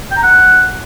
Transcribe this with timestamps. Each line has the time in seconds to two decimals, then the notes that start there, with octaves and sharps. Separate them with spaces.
0.11 G5
0.17 A#5
0.23 F#5